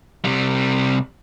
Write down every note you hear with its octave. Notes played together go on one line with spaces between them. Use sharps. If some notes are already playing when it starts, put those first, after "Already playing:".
C3 G3